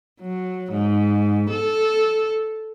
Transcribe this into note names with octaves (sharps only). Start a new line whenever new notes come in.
F#3
G#2
A4